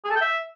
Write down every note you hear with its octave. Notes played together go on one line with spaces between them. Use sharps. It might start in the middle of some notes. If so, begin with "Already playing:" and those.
G#4
A4
G5
E5